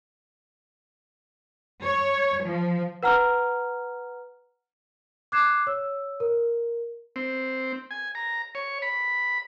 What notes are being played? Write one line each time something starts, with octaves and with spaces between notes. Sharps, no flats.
C#5
F3
B4 F#5 A#5 F6
D6 F#6 G#6 C7 E7
C#5 E6
A#4
C4
G#5
A#5
C#5
B5